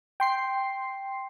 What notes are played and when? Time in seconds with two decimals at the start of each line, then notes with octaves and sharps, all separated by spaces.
0.20 G5 C6 C7